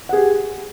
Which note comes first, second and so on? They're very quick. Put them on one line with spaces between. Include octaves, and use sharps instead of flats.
F#5 G#4 G4